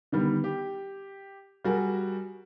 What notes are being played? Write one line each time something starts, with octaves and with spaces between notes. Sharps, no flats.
D3 D#3 G3 B3
G4
G3 F#4 G#4 A#4